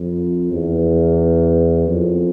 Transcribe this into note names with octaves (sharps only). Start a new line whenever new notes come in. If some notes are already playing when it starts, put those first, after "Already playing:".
Already playing: F2
E2
F2